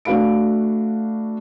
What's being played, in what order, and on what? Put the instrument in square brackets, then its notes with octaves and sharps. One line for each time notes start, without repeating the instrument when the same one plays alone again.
[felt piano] A3 D4 F#4 F5 B5 D7